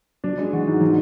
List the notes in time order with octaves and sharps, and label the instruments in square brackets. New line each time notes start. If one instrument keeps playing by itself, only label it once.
[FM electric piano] F#3 [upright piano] D4
[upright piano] G#3
[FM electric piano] E3 [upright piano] F#4
[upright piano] G#2
[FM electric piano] E3 [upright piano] F#3